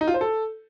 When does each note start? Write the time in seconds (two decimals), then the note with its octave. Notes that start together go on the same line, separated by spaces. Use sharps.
0.01 D#4
0.08 F4
0.14 C5
0.21 A4